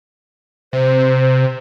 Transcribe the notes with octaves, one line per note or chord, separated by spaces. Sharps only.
C3 C5